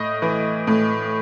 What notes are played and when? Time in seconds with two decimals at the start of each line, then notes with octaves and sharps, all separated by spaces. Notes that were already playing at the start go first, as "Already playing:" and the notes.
Already playing: A2 D#5
0.22 E3
0.67 A2